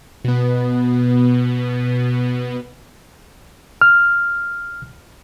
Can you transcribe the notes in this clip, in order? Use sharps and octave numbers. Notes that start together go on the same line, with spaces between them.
B2 B3
F6